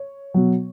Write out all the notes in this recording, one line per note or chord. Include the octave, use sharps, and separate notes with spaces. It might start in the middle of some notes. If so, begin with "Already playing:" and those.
Already playing: C#5
B2 F#3